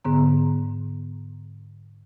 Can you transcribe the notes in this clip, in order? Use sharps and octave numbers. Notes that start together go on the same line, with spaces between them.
G#2 D3 B3 A#5